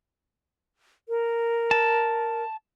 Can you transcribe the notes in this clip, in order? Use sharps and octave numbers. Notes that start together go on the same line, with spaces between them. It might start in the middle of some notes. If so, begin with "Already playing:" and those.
A#4
A5